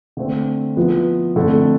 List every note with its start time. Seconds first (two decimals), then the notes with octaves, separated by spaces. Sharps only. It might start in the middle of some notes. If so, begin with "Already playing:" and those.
0.17 D3 A3 C4
0.77 F3 B3 E4 B4
1.36 F2 D3 A3 E4 A4